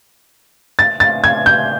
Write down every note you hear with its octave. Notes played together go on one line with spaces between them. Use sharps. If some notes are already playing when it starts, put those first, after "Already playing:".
A6
A6
G#6
G6